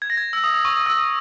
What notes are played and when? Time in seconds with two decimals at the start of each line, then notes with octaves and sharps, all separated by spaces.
0.02 G#6
0.10 A#6
0.17 G#6
0.33 E6
0.44 D#6
0.54 D#6
0.65 C#6
0.76 D#6
0.86 E6
0.97 D#6